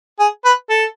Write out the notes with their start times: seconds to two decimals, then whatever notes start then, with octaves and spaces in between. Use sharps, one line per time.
0.20 G#4
0.45 B4
0.70 A4